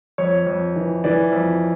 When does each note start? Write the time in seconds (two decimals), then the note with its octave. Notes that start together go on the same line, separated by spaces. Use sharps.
0.18 F2 C#5
0.47 F2
0.76 E3
1.04 E3 D5
1.33 F2